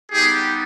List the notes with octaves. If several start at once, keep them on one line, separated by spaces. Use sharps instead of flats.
G3 B3 D#4 G4 G#4